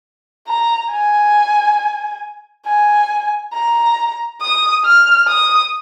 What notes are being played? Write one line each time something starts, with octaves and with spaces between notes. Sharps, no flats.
A#5
G#5
G#5
A#5
D#6
F6
D#6